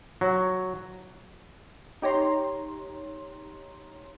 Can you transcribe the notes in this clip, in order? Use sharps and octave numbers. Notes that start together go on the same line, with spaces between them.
F#3
D#4 G4 C#5 A#5 C6